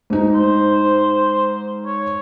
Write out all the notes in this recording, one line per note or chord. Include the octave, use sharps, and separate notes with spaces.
G#2 D#4
C5
C#5